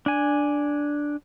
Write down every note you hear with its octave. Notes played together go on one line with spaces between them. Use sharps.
D4 G#5